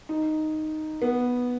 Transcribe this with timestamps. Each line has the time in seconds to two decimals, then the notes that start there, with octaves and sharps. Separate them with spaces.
0.09 D#4
1.02 B3